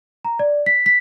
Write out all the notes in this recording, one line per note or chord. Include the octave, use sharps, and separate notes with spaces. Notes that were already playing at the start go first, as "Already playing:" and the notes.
A#5
D5
B6
B6